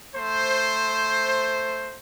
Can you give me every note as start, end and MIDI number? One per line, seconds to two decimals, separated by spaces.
0.14 1.97 57
0.14 1.97 72